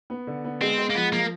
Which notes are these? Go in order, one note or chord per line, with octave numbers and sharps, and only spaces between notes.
B3
D3
B3
G#3 C4
G#3
A#3
F3 B3
F3 A#3